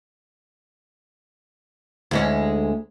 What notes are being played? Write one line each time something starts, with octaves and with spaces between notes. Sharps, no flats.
D2 G#3 C#4